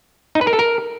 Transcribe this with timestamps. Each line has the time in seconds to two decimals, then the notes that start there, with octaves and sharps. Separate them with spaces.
0.35 D#4
0.41 B4
0.47 A#4
0.53 A4
0.59 A#4